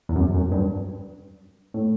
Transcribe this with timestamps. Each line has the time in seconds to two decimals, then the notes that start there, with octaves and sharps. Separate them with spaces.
0.09 E2
0.16 F#2
0.34 F#2
0.52 G2
1.74 A2